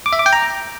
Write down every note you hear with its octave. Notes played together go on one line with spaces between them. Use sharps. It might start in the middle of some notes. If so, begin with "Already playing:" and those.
D6
E5
D6
G5
A#5